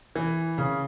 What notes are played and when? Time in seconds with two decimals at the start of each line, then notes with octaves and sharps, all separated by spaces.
0.15 E3
0.58 C#3